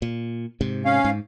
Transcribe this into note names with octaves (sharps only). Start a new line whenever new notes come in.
A#2
G#2 C3
C#4 F5
G#2